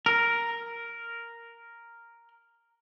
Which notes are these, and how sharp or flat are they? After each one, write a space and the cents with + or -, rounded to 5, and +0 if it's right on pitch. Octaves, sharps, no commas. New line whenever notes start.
A#4 +0